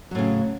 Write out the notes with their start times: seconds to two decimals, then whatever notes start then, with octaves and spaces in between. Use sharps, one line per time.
0.11 F#3
0.15 A2
0.19 C#3